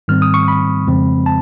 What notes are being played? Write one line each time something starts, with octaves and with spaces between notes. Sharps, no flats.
G#2 D#3 G3 C4 F6
D#6
C#6
B5
F2 C#3 F3 G#3 C4
A5